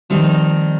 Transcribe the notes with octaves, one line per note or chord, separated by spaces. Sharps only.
F2 D#3 G3 C4 D#4